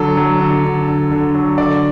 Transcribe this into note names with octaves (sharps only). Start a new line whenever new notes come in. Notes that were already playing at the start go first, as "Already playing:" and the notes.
Already playing: D3 F#3 A4
F#3
D3
D3
D3
D3
F#3
D3 D5